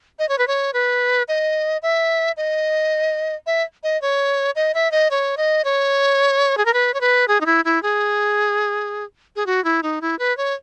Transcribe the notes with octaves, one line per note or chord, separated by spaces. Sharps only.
D#5
C#5
B4
C#5
B4
D#5
E5
D#5
E5
D#5
C#5
D#5
E5
D#5
C#5
D#5
C#5
G#4
A#4
B4
C#5
B4
G#4
D#4
E4
E4
G#4
G#4
F#4
E4
D#4
E4
B4
C#5